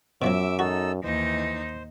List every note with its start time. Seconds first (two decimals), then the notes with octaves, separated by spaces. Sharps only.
0.22 F#2 B2 F3 F#3 E5 D6 E6
0.59 D#4 F#4 A4 E6
1.04 D#2 E3 D#4 C5